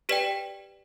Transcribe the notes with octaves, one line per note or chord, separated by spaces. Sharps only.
G4 B4 D5 G5 B6 E7